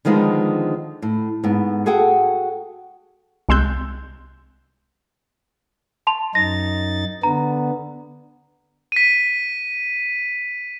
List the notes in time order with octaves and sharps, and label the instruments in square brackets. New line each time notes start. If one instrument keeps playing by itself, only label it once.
[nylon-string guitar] D3 D#3 F3 G#3 B3 D#4
A2
G#2 B3
F#4 G#4 A4 F#5 G5
[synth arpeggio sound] C2 G#3 C6 E6 F#6 G6
[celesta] A5 C6 F7
[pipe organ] F#2 D#4 A6 [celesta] A#6
[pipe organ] D3 B3 [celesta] A#5
[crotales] B6 D#7